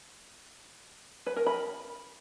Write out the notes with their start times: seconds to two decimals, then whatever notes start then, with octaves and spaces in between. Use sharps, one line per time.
1.26 B4
1.36 A#4
1.46 B5